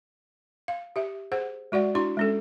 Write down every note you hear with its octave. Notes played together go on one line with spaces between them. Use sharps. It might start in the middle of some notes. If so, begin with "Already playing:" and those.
F5
G4 E5
G#4 C5 F#5
G#3 F#4 D5 F#5
D4 E4 F#4 C6
G#3 C#4 A4